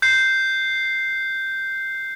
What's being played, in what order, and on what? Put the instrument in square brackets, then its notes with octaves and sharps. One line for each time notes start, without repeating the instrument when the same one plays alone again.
[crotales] G6 C7